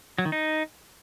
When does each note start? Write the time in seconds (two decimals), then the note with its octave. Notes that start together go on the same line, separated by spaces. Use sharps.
0.18 F#3
0.25 D#3
0.32 D#4